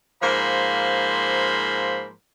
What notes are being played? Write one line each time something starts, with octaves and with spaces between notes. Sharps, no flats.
G#2 F3 A#3 C5 B5